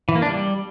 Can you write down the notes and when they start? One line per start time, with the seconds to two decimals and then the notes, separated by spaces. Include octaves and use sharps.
0.09 E3
0.15 A#3
0.22 D4
0.29 G3